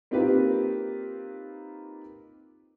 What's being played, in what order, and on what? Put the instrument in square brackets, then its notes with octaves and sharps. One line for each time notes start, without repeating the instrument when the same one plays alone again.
[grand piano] A#3 C4 D#4 F4 G4 B4